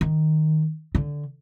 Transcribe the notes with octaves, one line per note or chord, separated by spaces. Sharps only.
D#3
D3